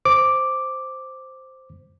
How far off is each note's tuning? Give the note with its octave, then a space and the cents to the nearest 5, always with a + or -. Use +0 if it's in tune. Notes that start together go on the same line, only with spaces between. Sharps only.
C5 +0 D6 +0